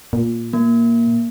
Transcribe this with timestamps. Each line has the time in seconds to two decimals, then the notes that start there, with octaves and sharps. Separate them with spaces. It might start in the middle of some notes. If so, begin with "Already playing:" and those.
0.13 A#2
0.53 A#3